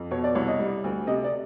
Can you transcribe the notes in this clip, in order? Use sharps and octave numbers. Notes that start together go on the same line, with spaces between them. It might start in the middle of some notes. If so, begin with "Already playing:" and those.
Already playing: F2
B2 C#5
D5
C2 C#5
D#5
G3
D2
C3 D#5
D5